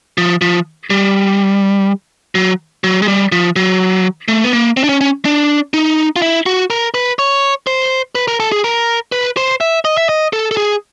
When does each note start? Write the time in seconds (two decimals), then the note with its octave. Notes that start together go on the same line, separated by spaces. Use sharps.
0.18 F3
0.42 F3
0.90 G3
2.35 F#3
2.84 F#3
3.02 G#3
3.08 G3
3.32 F3
3.56 F#3
4.28 A3
4.44 B3
4.53 A#3
4.77 C4
4.84 D4
4.89 C#4
5.01 C#4
5.25 D4
5.74 D#4
6.16 F4
6.22 E4
6.46 F#4
6.70 A#4
6.94 B4
7.19 C#5
7.67 C5
8.15 B4
8.28 A#4
8.40 A4
8.52 G#4
8.64 A#4
9.12 B4
9.37 C5
9.61 E5
9.85 D#5
9.97 E5
10.09 D#5
10.33 A4
10.51 A4
10.57 G#4